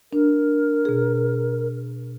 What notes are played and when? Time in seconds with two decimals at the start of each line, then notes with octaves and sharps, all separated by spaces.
0.13 D4 A#4
0.85 B2 G#4